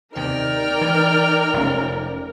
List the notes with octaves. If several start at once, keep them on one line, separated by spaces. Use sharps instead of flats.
D#2 C3 D#4 A#4 D5 G5 F6
E3
F1 G#2 C#4